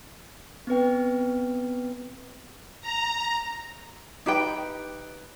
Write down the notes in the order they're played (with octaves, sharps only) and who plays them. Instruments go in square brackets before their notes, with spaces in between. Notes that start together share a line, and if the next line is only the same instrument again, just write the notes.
[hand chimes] B3 C4 B4 G5
[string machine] A#5
[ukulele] D#4 G4 B4 G5